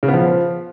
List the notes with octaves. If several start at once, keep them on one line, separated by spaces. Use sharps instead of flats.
C#3
B3
F3